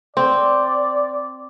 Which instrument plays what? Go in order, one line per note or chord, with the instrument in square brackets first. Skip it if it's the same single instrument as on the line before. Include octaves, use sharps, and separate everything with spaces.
[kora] C4 [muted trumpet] D5